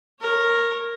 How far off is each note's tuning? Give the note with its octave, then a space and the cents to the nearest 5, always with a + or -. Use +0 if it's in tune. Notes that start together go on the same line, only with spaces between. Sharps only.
A#4 +0 C#5 -15